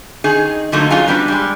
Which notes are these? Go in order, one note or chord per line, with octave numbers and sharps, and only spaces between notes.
D#3 D#4 G#4
D3 F3 F#3 A3 A#3 D#4
F#3 C#4 D#4 F4 G#4
G3 B3 D4 F#4 B4
G3 G#3